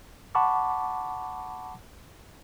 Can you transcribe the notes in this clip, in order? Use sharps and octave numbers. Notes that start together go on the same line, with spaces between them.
F#5 A5 B5 C#6 D6